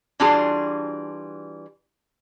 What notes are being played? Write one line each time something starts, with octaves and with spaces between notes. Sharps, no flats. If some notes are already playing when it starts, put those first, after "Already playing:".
E3 G3 D4 F4 F#4 G#4